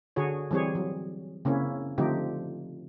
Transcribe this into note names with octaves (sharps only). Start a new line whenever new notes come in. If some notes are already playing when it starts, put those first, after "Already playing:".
D3 F#4 G#4 C#5
E3 G3 C4 G#4 C#5
F#3
C#3 A#3 C4 C#4 E4
D3 F3 A3 C4 D#4 G4